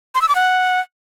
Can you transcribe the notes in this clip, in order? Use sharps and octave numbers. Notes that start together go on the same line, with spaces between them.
C6
E6
D6
F#5